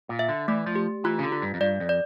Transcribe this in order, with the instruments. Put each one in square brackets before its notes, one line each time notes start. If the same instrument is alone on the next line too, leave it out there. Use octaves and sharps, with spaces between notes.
[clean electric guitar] A#2
[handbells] E5
[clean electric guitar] D3
[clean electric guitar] E3 [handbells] A3
[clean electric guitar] F3
[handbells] G4
[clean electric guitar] E3 [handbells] F4
[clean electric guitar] C#3
D3
[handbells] F4
[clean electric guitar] G2
F2
[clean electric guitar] G2 [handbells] D5
[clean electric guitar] F2
[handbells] D5